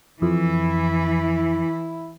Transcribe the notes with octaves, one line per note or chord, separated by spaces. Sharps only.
F2 E3 E4